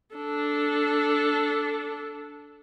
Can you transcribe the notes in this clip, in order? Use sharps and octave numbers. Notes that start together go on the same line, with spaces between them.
D4 A4